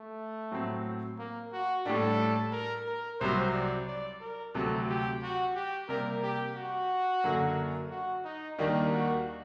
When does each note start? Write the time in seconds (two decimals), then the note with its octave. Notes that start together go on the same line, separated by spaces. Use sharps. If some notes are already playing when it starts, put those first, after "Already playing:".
Already playing: A3
0.52 A2 F#3 C4
1.19 A#3
1.52 F#4
1.86 A2 G3 D4 A4
2.52 A#4
2.87 A#4
3.20 C2 C3 F#3 C5
3.54 D5
3.88 D5
4.21 A#4
4.55 D2 C3 F#3 A4
4.89 G4
5.23 F#4
5.55 G4
5.89 C3 G3 A#3 A#4
6.23 G4
6.56 F#4
7.24 F#2 D3 F#3 A#3
7.91 F#4
8.24 D#4
8.58 D#2 D#3 G3 A#3 D4 D#4
8.92 F#4